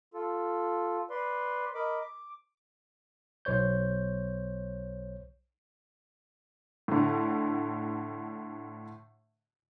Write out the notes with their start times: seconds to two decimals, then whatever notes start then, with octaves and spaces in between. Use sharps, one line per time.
0.14 F4 A4
1.10 B4 D5 C6
1.75 A#4 D#5 B5 D6
2.01 D6
3.45 B1 C5 C#5 G6
6.88 A2 D3